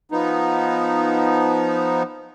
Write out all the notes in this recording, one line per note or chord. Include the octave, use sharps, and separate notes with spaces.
F3 B3 D#4